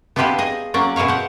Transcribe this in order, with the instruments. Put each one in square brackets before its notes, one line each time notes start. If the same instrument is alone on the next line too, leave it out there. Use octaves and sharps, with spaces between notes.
[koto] B3 D4 E4 F4 G4 B4
G#4 D#5
F#3 A#3 C#4 D5
B2 E4 G#4 C#5 F5
C5 F#5